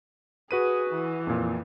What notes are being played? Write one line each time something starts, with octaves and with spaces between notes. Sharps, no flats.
F#4 G#4 B4 D#7
E3
F2 A#2